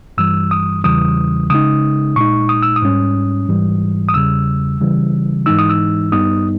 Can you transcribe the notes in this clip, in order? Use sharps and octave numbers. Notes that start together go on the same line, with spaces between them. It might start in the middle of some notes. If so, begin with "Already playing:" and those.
G2 E3 G3 E6
D#6
E2 C#3 E3 G3 D#6
C#3 G#3 D#4 D#6
A#2 G#3 D#4 C#6
D#6
E6
D#6
G#2 G3 C#4
G#2 E3 G3
D#6
E2 C#3 G3 E6
C#3 E3 G3
G#2 E3 G#3 D#4 E6
D#6
E6
G2 G3 B3 D#4 D#6